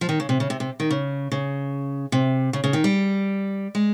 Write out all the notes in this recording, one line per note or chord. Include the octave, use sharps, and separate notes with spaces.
F3
D#3
C#3
C3
C#3
C3
C3
D#3
C#3
C#3
C3
C#3
C#3
D#3
G3
G#3